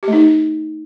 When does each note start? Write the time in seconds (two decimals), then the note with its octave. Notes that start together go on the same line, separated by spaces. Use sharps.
0.03 G4
0.08 A3
0.13 D#4